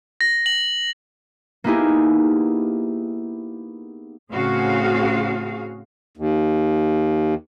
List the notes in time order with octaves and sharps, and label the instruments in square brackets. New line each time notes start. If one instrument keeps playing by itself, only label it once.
[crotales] A#6
F#7
[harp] A#3 B3 D#4 E4 G4 G#4
[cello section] A2 C#3 C4 F#4 G#4 F5
[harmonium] D#2